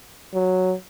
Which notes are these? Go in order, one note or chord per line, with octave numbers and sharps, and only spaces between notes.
F#3